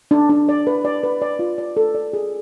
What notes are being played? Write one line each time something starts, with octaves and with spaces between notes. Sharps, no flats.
D4
D4
D5
B4
D5
B4
D5
F4
D5
A4
D5
G#4